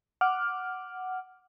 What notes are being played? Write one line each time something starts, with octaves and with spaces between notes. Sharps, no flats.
F#5 D6 F6